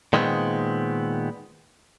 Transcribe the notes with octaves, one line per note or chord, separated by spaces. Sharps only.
A#2 D#3 G#3 A3 B3 C4